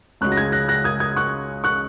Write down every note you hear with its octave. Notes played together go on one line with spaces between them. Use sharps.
C#2 C#3 G#3 F#4 C#6 F#6
A#6
D#6 G#6
F#6 A#6
F#6 A#6
D#6 G#6
D#6 G#6
C#6 F#6
C#6 F#6